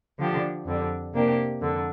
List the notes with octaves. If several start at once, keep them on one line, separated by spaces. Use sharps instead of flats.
D3 F3 D4 G4
F2 D3 G3
C3 A#3 D4 G4
F2 D3